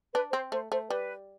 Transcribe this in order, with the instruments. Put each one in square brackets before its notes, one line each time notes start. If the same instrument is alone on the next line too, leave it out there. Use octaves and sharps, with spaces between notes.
[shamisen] D4 [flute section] B4
[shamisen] C4 [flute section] C5
[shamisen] A3 [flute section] C5
[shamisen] A3 [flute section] C5
[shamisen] G3 [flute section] B4